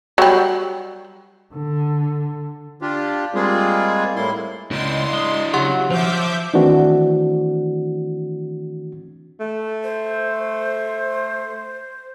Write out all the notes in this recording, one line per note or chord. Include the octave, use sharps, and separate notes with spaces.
F#3 G3
D3
D4 F4 G4
G3 G#3 A#3 C4 F4 G#4
A2 A#3 E4 C6
C#2 D4 E4 C6
G#3
C#3 F#3 G4 F#5 C6
F3 C5 E5 D6 G6
D#3 E3 A3 C4 D4 F#4
A3
C5